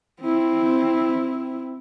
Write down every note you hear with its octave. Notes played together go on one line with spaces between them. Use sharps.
C4 E4